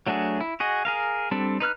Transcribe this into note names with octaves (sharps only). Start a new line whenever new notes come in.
F#3 A3 D4 F#4 G#4
E4
F#4 G#4 D#5
G#4 A#4 F5
G3 C4 D4 A4
D#4 B4 F6 F#6